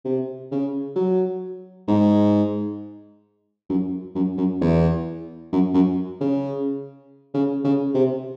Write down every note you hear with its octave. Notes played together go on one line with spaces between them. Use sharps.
C3
C#3
F#3
G#2
F#2
F#2
F#2
E2
F#2
F#2
C#3
C#3
C#3
C3